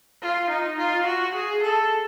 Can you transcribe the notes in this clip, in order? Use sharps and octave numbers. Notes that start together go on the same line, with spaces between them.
F4
D#4
F4
F#4
G#4
A4